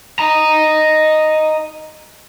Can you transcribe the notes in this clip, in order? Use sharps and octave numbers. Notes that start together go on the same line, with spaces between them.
D#5 A#5